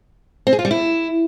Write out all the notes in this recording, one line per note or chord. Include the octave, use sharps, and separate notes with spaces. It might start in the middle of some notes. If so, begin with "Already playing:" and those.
C4
G#4
F4
G3
E4